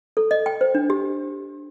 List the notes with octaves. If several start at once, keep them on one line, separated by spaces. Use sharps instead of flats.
A4
D#5
G5
C5
D4
G4